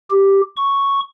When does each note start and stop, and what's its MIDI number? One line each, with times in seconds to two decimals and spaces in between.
0.10 0.41 67
0.57 1.00 85